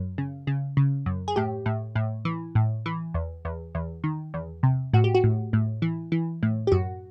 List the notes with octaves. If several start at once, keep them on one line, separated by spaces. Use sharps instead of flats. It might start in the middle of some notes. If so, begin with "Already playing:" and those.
Already playing: F#2
C#3
C#3
C#3
F#2
G#4
A2 G4
A2
A2
E3
A2
E3
E2
E2
E2
D#3
E2
C3
A2 F#4
G4
F#4
A2
A2
E3
E3
A2
G4
F#2 F#4